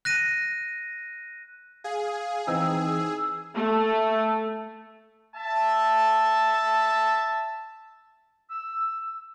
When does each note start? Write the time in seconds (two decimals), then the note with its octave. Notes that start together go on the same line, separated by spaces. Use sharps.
0.05 F#6 A#6 D#7
1.84 G#4 F5
2.47 E3 C4 D#4 E6
3.55 A3
5.36 E5 A5
8.50 E6